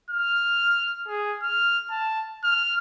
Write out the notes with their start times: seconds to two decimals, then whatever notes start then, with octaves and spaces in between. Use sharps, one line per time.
0.11 F6
1.08 G#4
1.42 F6
1.90 A5
2.44 F6